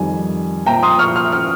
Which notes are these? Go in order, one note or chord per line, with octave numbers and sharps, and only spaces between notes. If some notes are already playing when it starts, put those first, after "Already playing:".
Already playing: F2 D#3 G3 G#5
A#2 F3 G5 A#5
C6 D#6
C#6 F6
F6
F6